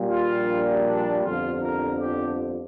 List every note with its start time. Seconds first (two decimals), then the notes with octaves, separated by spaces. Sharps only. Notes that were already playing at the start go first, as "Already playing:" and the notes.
Already playing: A#1 A#2 G3
0.08 F4
0.85 D4
1.23 G1 F2 D3 F3 F4
1.62 A#4
2.00 G4